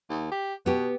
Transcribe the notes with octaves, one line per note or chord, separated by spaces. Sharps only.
D#2
G4
B2 B3 G4